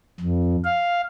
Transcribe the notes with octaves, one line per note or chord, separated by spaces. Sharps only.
F2
F5